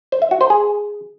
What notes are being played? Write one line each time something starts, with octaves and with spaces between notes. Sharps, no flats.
C5
E5
F#4
C5
G#4